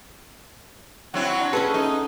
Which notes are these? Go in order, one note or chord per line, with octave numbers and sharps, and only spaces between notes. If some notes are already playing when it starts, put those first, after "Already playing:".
F#3 C4 E4 F#5
D4
C#4 G#4 A4 B4
A3 D#4